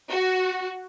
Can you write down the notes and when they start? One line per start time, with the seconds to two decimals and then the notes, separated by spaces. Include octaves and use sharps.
0.11 F#4